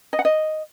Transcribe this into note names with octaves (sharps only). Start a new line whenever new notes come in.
D#5
F#5
D#5